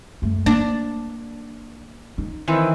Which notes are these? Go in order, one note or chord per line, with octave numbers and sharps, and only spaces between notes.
F#2 A3
A#3 D4
D#4
D#3 E3 C4